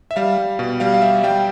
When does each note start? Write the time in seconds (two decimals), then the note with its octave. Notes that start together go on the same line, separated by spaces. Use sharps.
0.11 E5
0.16 G3 F5
0.38 G3
0.59 B2
0.80 G3 F5
0.94 F5
1.02 G3 E5
1.23 G3 G5